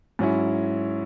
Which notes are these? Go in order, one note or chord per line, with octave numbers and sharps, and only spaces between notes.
G#2 F#3 C#4 E4